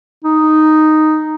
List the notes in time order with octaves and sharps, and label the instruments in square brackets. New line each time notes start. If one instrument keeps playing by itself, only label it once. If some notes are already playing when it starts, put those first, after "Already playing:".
[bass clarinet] D#4